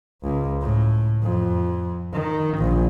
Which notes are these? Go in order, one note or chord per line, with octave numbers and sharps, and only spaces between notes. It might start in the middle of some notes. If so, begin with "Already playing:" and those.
C#2
A2
F2
D#3
A#1